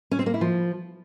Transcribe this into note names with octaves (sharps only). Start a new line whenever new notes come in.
C#4
C4
A#3
E4
F3